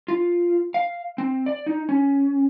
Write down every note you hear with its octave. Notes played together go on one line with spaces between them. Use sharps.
F4
F5
C4
D5
D#4
C#4